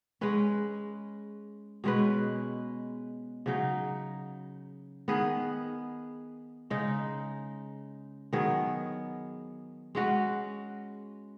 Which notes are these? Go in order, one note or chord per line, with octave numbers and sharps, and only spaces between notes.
G#3 C#4 B4
B2 G#3 C#4 B4
C#3 F#3 D#4
D#3 B3 G#4 B4
C#3 G#3 D#4
D#3 F#3 B3 G#4
G#3 C#4 F#4 B4